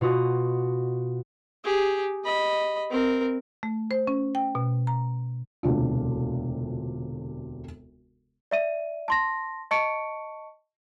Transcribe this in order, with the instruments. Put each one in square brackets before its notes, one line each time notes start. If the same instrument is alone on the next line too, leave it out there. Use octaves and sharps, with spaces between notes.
[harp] B2 F4 F#4 D#6
[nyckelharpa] G4 G#4
D#5 B5
C4 A#4
[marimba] A3
C5
C#4
G5
B2
A#5
[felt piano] E1 D2 C3 D4 F4
[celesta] D5 E5 D#7
A5 C6 A#6
D#5 A5 C#6 C#7 D7